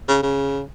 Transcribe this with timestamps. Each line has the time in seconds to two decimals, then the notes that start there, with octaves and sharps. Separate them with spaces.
0.09 C#3
0.23 C#3